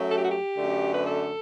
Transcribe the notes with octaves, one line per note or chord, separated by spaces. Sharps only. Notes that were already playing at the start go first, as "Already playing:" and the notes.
Already playing: F#2 F#3 A3
A4
G4
F#4
G4
F#2 D3 A3
B4
A4